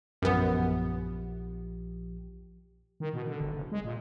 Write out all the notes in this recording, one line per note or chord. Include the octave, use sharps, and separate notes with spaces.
A#1 F#2 F3 B3 G4
D#3
B2
D3
G1
F#1
G#3
A#2